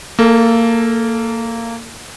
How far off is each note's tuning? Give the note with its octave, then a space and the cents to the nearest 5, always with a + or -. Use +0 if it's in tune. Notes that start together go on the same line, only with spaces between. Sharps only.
A#3 -20 A4 +0